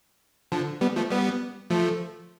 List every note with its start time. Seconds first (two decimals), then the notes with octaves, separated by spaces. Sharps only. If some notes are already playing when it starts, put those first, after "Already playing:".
0.52 D3 F3
0.81 G3 B3
0.96 F3 A3
1.10 G3 B3
1.70 F3 A3